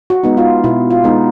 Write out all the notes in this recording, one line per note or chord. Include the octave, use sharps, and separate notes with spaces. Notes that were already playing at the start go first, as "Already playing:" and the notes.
F#4
G#3 B3 D#4
F4
B2 E4
F4
G#3 B3 D#4